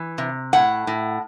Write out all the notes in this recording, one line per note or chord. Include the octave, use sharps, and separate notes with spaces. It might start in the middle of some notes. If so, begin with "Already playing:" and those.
Already playing: E3
C3
A2 F#5
A2